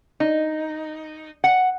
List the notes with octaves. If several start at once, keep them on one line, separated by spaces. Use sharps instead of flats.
D#4
F#5